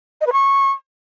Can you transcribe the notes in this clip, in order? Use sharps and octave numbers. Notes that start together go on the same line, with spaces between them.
D#5
B4
C#6